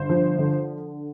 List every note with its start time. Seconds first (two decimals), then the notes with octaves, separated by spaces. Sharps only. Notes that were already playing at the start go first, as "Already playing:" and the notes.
Already playing: G1 C5
0.09 F3
0.38 D3